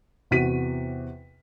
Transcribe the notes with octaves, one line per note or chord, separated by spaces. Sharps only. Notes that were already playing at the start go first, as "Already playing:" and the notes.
E2 C3 F#4 B6 D#7